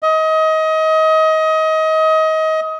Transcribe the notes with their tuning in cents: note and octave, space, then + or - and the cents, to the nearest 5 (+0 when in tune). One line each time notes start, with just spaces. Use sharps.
D#5 +25